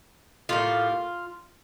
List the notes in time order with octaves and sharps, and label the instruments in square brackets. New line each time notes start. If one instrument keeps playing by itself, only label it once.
[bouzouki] A2 G3 A#3 F4